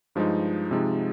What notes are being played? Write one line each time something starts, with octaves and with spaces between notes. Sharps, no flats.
G2 F3 G#3 D#4
C3 F3 G#3 D#4